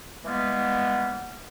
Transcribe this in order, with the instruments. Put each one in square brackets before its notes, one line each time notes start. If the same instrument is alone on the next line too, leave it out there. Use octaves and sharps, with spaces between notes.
[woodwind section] E3 G3 G#3 A#3 B3